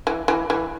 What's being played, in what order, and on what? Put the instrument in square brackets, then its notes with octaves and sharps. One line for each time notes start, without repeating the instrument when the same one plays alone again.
[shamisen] E3
E3
E3